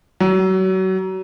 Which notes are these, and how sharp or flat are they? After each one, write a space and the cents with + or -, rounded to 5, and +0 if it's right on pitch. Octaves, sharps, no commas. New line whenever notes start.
F#3 +30